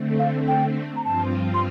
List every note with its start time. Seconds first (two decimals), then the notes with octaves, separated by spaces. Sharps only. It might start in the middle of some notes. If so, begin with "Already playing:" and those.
Already playing: D3 A3 C4
0.19 F5
0.48 G5
0.96 A#5
1.04 G2 F3 C4 F4 A5
1.54 C6